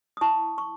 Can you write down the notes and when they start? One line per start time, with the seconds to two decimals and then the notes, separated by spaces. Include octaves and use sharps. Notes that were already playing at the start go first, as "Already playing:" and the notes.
0.17 D#6
0.21 E4 A5 C#6
0.58 C#6